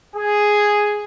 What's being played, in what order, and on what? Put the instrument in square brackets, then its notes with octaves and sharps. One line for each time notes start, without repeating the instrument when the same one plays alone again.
[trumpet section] G#4